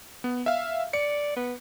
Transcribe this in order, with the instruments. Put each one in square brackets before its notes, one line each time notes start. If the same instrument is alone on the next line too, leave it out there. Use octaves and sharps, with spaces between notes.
[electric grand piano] B3
E5 F5
[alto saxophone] D5 [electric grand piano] C#7
[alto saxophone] B3